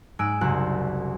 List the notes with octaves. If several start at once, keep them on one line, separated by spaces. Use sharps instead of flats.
G#2 G#3 G#5 E6 F#6 D7
F#1 C2 F#4 C5 F#6